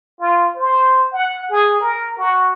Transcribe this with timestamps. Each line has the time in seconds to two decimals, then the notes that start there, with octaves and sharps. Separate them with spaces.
0.20 F4
0.56 C5
1.13 F#5
1.50 G#4
1.81 A#4
2.18 F#4